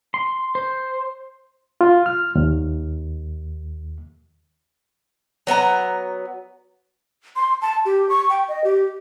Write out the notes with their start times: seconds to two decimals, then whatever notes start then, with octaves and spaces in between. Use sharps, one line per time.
0.14 C6
0.55 C5
1.81 F4
2.06 F6
2.35 D#2
5.47 F#3 B3 D#5 A#5
7.36 C6
7.62 A5
7.85 G4
8.09 C#6
8.30 G5
8.48 D#5
8.64 G4